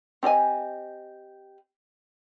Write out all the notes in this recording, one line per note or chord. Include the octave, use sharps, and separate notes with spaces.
C4 G4 D#5 G#5